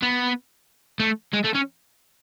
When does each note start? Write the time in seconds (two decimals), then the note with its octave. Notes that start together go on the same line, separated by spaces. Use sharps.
0.02 B3
1.00 A3
1.33 G#3
1.44 A3
1.55 C#4